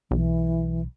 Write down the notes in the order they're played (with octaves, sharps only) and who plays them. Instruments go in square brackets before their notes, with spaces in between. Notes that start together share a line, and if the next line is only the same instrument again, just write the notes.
[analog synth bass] B1 [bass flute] E3